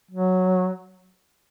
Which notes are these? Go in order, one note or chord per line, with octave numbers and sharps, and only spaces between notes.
F#3